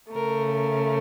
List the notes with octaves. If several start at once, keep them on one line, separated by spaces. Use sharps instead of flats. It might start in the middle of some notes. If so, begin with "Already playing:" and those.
C#3 A3 A#4
A#4